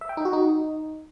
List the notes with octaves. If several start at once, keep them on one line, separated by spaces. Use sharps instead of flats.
E5
G5
D#4
F#4
D#4